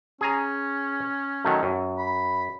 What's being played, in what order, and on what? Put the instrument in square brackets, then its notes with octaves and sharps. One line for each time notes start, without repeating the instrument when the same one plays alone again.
[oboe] C#4 [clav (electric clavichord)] G#4 G#5 A#5
[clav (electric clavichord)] D#3 F#3 A3
F#2
[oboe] B5